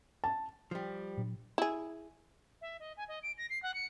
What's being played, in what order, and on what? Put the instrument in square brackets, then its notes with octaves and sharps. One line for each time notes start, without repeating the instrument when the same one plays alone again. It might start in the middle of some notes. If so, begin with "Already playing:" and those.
[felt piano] A5
[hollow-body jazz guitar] F3 G3
[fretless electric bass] A#2 F#3 D4
[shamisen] E4 G#4
[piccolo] E5
D#5
G#5
D#5
D7
A#6
C7
F#5
C#7